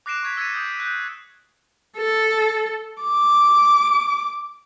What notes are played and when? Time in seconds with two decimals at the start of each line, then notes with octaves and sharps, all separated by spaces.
0.06 D6 F#6 A#6 C7 D7 E7
0.23 C#6 G#6 B6
0.37 E6 G#6 A6 B6 C#7 D#7
0.52 D#6 G6 C7
0.80 F#6 G6
1.98 A4
3.02 D6